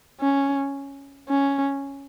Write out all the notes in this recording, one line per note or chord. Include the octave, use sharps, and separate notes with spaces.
C#4
C#4